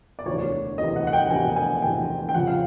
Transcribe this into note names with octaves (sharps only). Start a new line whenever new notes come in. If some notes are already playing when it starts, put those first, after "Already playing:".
D5
E1 D2 C3 E3 C#5
E1 D2 C3 E3 D#5
F#5
F#5
G5
E1 D2 C3 E3 G#5
G#5
E1 D2 C3 E3 G5
G5
F1 F2 C#3 F3 F#5
F5